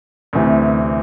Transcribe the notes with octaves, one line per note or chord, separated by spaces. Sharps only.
D2 C3 E3